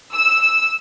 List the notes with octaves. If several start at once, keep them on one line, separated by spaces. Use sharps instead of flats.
E6